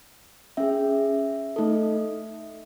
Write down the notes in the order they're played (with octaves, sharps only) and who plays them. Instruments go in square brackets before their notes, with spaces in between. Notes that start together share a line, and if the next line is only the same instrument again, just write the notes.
[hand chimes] C#4 G#4 E5
A3 D#4 A4